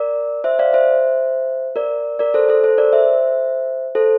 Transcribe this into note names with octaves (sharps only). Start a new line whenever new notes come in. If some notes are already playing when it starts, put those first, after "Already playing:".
Already playing: A#4 D5
C5 E5
D5 F5
C5 E5
A#4 D5
A#4 D5
A4 C5
A4 C5
A4 C5
A#4 D5
C5 E5
A4 C5